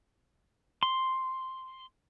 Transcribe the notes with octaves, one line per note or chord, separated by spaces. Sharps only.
C6